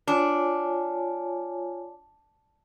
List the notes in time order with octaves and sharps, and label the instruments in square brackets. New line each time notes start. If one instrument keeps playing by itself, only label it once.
[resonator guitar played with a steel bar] D4 [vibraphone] F4 C#5 G#5